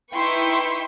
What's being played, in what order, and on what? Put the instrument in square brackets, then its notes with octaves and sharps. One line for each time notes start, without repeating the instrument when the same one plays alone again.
[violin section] D#4 E4 B4 G5 C6 C#6